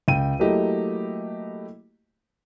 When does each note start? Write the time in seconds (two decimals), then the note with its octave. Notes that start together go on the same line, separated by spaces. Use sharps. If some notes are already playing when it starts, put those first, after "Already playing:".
0.08 C#2 G5 D#7
0.39 F#3 A3 A#3 E4 G4 D#5